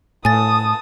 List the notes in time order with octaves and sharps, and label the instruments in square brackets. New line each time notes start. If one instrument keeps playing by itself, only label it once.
[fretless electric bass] A2 [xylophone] G#5 A6 [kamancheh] A5 D#6